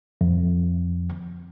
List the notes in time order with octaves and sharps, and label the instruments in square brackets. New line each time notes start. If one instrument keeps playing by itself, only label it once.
[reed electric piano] F2